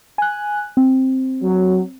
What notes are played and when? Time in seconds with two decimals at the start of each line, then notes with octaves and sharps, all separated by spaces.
0.18 G#5 F#6
0.77 C4
1.42 F#3